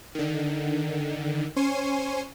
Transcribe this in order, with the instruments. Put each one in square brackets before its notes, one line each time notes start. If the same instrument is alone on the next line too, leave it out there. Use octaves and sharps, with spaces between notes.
[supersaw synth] D3 D#3
C#4 C5 G#5 C#6 C7 D#7